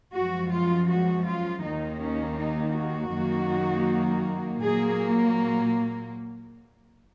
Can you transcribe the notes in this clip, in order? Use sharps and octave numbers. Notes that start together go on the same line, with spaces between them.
F#2 F3 G#3 F#4
F4
F#4
F4
D#2 D#3 A#3 D#4
C#4
D#4
F#4
F#2 D#3 F#3 A#3
A#2 F#3 A#3 G#4